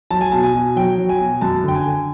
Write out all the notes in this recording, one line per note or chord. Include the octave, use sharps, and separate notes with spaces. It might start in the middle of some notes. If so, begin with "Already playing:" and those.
F#3 A5
G#5
B2 A5
G#5
B2
F#3 G5
F#3
G#5
B2
F#2 A5
D3 G5
G#5
D3